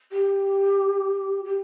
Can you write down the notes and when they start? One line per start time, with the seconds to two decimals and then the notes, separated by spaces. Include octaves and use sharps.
0.12 G4
1.44 G4